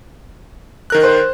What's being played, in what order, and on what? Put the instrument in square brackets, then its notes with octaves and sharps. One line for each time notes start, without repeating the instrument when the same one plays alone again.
[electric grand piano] D#3 A#4 F#6
[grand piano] C5